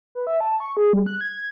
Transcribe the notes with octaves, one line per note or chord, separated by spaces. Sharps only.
B4
E5
A5
C#6
G#4
G3
F#6
G#6